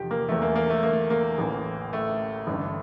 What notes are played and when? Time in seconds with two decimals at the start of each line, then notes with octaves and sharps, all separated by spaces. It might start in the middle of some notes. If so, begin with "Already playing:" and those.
Already playing: F1 E2 D3 F3 G4
0.11 A#3
0.29 E2 E3 A3
0.42 A#3
0.56 A#3
0.70 A3
0.83 A#3
1.10 A#3
1.38 A1 A2 E3
1.93 A3
2.47 A1 G2 D3